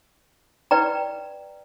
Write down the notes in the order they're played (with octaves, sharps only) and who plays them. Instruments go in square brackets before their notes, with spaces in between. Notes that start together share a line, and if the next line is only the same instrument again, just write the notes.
[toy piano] B4 D5 G5 A#5